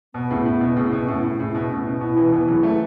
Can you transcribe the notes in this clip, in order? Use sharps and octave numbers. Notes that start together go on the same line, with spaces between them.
B2 B3
A2 C#3
A2
B2
A2 C#3
B2
B3
A2 C#4
A2
A2 C#3
B2
A2
B2
B2 E4
B2 E3
B2 E3
C#3 F#3
E3 A3